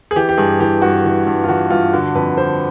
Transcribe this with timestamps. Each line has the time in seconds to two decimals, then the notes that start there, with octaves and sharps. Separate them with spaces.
0.11 G#4
0.16 E3 G4
0.29 G4
0.38 G2 G#4
0.60 E3 G4
0.82 G2 F#4
1.05 E3
1.27 G2
1.44 F4
1.48 E3 F#4
1.70 G2 F4
1.93 D3 F#4
2.15 F2 B4
2.37 D3 C5